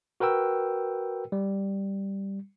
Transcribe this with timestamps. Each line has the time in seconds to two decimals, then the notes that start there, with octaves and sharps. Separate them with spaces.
0.20 F#4 A#4 B4 G5 E6
1.32 G3